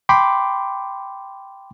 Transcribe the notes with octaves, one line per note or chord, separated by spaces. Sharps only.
G5 B5 C6 D6